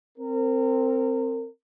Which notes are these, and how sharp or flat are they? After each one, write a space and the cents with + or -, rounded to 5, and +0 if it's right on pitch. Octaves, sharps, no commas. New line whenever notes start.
C4 +0 A#4 -30